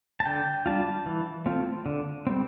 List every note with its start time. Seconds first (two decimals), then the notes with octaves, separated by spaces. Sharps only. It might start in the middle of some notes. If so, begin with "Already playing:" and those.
0.20 A5
0.26 D3 G5
0.66 G3 D4 F4 A5
1.06 E3
1.46 A3 C4 F4
1.86 D3
2.27 G3 C4